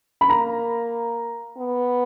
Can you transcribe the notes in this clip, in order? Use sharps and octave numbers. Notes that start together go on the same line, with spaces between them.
B5
A#3 A#5
B3